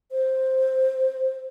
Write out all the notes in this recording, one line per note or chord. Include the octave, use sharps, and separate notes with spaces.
C5